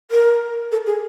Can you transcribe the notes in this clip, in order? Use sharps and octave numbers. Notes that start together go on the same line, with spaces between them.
A#4
A4
G#4